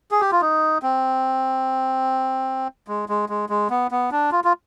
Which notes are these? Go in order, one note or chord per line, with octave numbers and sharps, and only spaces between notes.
G#4
G4
F4
D#4
C4
G#3
G#3
G#3
G#3
B3
B3
D4
F4
F4